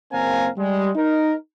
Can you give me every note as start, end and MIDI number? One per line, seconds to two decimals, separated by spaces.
0.11 0.48 30
0.11 0.48 58
0.11 0.48 60
0.11 0.48 77
0.11 0.48 80
0.11 0.48 82
0.57 0.91 55
0.57 0.91 56
0.96 1.34 63
0.96 1.34 70